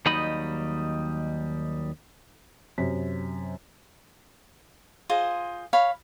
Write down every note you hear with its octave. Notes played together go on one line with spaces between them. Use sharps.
D#2 F#3 G3 D#4 D#5 B5
F#2 C3 B6
F4 G#4 C5 D#5
C#5 F5 B5